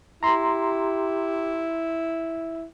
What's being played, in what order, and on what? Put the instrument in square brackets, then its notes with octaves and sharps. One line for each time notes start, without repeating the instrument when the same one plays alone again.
[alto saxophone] E4 [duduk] G4 [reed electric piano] A#5 C6